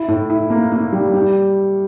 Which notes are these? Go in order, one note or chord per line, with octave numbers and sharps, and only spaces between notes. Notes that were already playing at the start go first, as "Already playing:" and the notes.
Already playing: E4
A2
E4
A#3
A#3
G3
G3